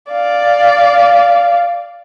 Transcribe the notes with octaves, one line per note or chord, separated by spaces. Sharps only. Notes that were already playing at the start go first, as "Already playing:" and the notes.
D5 F5